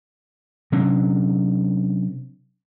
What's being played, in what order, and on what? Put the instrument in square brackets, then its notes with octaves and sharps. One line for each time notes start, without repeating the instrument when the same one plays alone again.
[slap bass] C3 F#3 C#4 D4